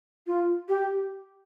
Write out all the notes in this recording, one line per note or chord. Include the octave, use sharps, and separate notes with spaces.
F4
G4